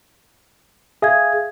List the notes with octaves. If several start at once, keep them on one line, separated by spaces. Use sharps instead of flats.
G#4 E5 F5 G#6